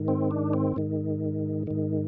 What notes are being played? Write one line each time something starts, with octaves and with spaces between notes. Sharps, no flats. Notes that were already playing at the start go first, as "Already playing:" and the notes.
Already playing: G#2 D#3
C4
D4
C4
G#2 D#3
G#2 D#3